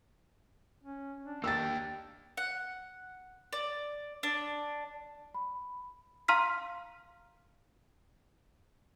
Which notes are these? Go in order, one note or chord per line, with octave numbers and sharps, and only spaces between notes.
C#4
D4
A#3 G4 E6 A6
F#5
D5
D4
B5
F5 A#5 C6 F6 B6